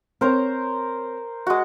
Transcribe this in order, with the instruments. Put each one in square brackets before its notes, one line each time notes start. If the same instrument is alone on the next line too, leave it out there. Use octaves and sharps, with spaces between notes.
[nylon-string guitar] C4 C#5 [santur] A#4 C5 A#5
[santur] G#3 F#4